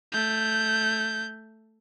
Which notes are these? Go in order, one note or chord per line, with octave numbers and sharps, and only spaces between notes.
A3 G6